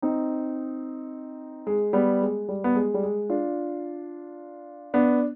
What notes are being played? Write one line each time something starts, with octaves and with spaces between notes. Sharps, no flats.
C4 D#4
G#3
G3 B3
G#3
G3
B3
G#3
G3
G#3
D4 F4
B3 D4